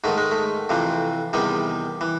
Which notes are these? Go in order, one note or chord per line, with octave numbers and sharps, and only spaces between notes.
G#2 D#3 A3
G#3
A3
F2 C3 E3
E2 C3 D#3 G3
E3